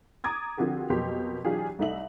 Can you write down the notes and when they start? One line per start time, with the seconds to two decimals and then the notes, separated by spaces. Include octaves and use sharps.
0.24 A#5 D6 D#6 G#6 A6
0.57 D3 F3 C4 F#4 G4 A#4
0.90 F2 B2 F#3 A#3 G4 C6
1.45 E3 F#3 D4 F4 G4 G#4
1.79 C2 A3 D#4 E5 F#7